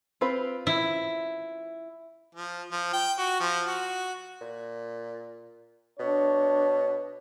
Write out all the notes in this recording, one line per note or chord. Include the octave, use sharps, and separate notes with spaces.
C4 F4 B4
E4
F3
F3
G5
F#4
F3
F#4
A#2
B2 D4 C#5